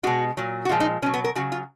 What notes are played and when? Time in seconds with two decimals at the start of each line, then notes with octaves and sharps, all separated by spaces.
0.03 B2 G#3 F#4
0.37 A#2 F#3
0.65 F#4
0.69 A#2 F3 G#3 F4
0.80 D#4
1.02 B2 C#4
1.06 F#3
1.14 B3
1.24 A#4
1.35 C#3 F#3 F#4
1.52 F4